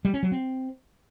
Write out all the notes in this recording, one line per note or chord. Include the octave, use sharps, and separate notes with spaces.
G3
C#4
F#3
C4